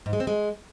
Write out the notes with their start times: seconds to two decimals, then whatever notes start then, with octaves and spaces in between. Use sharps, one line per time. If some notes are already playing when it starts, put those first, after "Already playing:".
0.06 G#2
0.13 G#3
0.20 C4
0.27 G#3